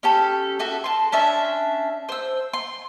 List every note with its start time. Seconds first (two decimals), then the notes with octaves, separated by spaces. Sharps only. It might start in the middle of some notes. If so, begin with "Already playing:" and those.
0.03 C#4 G4 A4
0.59 F#4 A4 E5
0.84 A5 C6
1.12 C#4 D4 E5 A5
2.09 C5 E6
2.53 C6